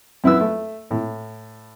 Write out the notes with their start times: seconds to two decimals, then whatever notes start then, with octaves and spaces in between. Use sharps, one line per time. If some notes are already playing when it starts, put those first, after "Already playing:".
0.24 F#2 E4 B4 E6
0.41 A3
0.91 A2